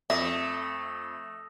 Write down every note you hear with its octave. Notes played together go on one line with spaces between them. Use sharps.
F2 A3 E5 D#6 A#6